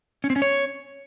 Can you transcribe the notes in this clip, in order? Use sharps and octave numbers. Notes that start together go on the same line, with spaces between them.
C#4
C4
C#4
C#5